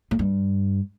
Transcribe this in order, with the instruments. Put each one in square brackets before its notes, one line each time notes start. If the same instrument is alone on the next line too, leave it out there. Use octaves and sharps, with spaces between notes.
[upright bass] A2
G2